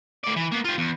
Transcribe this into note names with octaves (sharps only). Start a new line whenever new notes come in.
A2 D5
E3
A#3 B3
F4 G4
E2